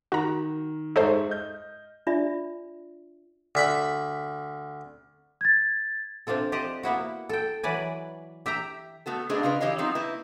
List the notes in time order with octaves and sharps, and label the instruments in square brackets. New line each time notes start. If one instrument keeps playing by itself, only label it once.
[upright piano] D#3 [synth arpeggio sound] F#4 A#5
[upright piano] G#2 E5 C#6 [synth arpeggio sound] D#4 A4 C5
[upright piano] D#5 G6
[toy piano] D4 F4 D5 E5
[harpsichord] D2 E5 B5
[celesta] G#6 A6
[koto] C3 C4 D4 F4 A4
G4 C5 D5 D#5
A#3 B3 E4 F#4
A4 G5
E3 F#3 B4 D5 G#5
G4 E5 G5 A#5
[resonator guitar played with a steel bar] A3 B3 F#4 A4
A3 B3 D4 G#4 C5 D#5
C#3 F4 A#4 B4
E3 G4 C#5 D#5 F5
F#3 G#3 B3 C4 D#4 F4
A#3 E4 B4